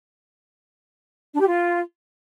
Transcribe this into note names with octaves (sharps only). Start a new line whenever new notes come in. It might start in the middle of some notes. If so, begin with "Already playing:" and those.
D4
G4
F4